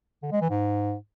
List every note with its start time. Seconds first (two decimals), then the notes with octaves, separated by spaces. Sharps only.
0.23 D3
0.32 G#3
0.41 E3
0.50 G#2